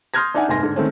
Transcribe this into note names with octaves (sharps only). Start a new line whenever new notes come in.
C6 D#6 F6 G6 G#6 A#6
D4 D#4 D5 E5 F#5 G#5
F1 C2 G#2 G#5 C6 A#6
G#2 D3
D#3 G#3 A3 C4 C#4